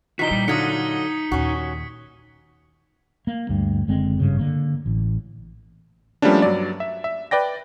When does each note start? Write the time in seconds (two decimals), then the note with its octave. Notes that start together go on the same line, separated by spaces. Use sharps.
0.19 C3 E3 D#4 F4 F#4 B6 G7
0.31 A#2 G3
0.48 D3 F#3 D#4 F4 D#6 G#6 C#7
1.32 D#2 A#2 C#4 F#4
3.27 A#3
3.49 D2 G2
3.88 F#1 D3 G#3 C4
4.20 G#1 G2 C#3
4.39 D3 A#3
4.86 A1
6.22 F3 G3 A3 A#3 C#4 D4
6.42 G2 F#3 D5
6.80 E5
7.04 E5
7.31 B4 D5 G5 A#6